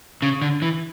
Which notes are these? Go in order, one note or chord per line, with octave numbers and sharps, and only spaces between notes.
C#3
D3
E3